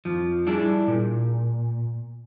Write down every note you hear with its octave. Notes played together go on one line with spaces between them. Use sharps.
F2 F3
G3 D4 E4 G#4
A#2